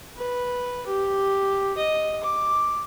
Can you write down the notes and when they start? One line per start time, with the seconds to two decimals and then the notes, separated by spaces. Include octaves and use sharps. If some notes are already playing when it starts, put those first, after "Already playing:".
0.17 B4
0.86 G4
1.78 D#5
2.24 D6